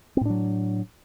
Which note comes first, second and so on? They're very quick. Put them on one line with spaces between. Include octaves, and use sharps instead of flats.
C4 A2 D4 F#3